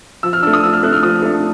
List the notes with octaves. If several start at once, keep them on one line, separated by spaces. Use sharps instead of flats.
F3 E6
F6
A3 D4 E6
D#6
F3 E6
F6
A3 D4 F#6
F6
F3 D#6
A3 D4